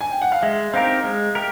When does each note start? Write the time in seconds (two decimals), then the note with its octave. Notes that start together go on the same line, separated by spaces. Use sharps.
0.01 G#5
0.11 G5
0.22 F#5
0.32 F5
0.42 G#3 E5
0.73 C4 D#4 G4 A#4 F5
1.04 G#3
1.35 G4 A#4